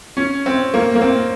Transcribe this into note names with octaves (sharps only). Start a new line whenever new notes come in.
C#4
C4
A#3
A#3
C4